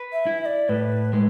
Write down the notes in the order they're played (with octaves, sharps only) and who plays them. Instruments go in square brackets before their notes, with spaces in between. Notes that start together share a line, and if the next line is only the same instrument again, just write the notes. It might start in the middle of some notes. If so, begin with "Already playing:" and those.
Already playing: [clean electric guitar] B4
[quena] E5
[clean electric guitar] E4
[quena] E5
D5
[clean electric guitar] A2 [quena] B4
[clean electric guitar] G#3 [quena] B4